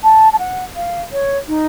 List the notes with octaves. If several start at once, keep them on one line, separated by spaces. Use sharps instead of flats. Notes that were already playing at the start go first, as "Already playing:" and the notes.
A5
A5
F#5
F5
C#5
D#4